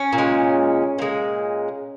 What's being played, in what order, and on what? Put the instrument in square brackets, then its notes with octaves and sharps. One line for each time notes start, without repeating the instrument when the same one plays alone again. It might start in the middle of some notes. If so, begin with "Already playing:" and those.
Already playing: [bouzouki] C#4
A#2
G#3
A#2 G#3